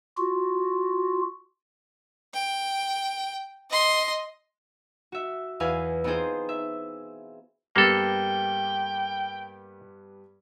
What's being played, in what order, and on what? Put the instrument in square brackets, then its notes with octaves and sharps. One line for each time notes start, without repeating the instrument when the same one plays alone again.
[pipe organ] F4 F#4
[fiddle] G5
D#5 C6
[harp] F#4 E5
E2 E4 B4 F5 G#5
B3 C4 D#4 F4 G#4 C5
E5
[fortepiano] G2 B3 G4 [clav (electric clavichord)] A#3 A4 [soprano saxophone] G5